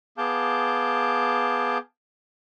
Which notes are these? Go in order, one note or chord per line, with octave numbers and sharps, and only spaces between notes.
B3 G#4 F5 A5 D6 G6